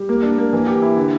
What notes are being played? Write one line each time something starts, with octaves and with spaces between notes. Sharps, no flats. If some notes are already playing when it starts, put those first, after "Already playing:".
Already playing: G3
A#3
D4
A#3
E3
G4
E4
D3